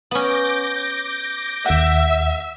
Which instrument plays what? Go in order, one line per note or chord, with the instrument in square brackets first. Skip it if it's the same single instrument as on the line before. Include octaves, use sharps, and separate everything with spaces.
[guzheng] B3 C#4 [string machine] D6 G6 A#6
[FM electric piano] D#2 F#5 [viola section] E5